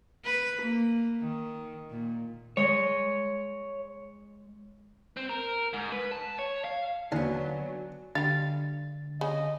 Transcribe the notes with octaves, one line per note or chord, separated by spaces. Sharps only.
B4
A#3
D#3
A#2
G#3 C#5 D#5
C4
A#4
G#2
B4
A5
C#5
F5
D#2 D3 F#3 B3 D5 G#5 A5
D3 G3 F5 A6
C#3 D#5